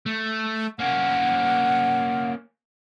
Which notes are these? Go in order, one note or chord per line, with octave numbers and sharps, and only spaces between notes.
A3
A#3 C#4 F#5